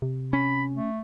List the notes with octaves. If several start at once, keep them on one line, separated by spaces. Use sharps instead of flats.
C3
C#4 B5
A3